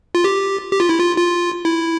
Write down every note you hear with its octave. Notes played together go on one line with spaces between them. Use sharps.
F4
G4
G4
F4
E4
F4
F4
E4